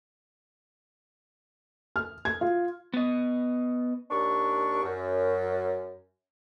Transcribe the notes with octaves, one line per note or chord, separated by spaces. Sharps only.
F6
G#6
F4
B3 D#5
D#2 D4 C#6
F#2